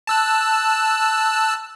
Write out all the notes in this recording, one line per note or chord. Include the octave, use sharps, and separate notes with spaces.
A5 E6 F#6